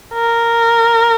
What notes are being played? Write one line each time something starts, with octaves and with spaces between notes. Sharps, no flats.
A#4